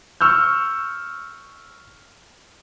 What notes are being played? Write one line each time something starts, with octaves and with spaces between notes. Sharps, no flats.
C#6 E6 F6 G6